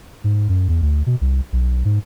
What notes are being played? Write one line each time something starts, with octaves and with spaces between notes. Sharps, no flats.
G#2
F#2
E2
D2
B2
C2
B1
G#2